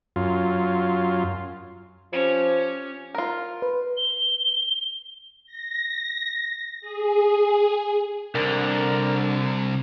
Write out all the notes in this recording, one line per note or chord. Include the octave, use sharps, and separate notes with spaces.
F#2 F4
F3 C#4 G4
F4 A#4
B4
G7
A#6
G#4
C2 D3 A#4